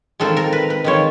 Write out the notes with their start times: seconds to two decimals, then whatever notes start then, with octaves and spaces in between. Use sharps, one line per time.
0.20 D#3 G#3 C4 F4 A4
0.37 A#4
0.52 B4
0.70 B4
0.84 D#3 G#3 C4 F4 C#5